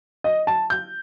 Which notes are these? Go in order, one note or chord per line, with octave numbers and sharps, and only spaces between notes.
D#5
A5
G6